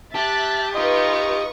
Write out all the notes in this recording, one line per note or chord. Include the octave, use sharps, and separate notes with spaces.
G4 E5 A5 F#6 A6
D#4 F4 B4 D#5 C#6 D#6